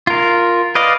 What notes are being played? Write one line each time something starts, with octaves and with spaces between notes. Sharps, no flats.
F4 A#4
B4 D5 D#5 F5